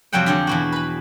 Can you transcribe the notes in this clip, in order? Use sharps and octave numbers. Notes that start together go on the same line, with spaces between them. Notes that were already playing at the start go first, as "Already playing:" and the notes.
F2 C3 F#3 G3 F#5 G5
D3 G4 G#4
E2 B2 F#4
B4 B5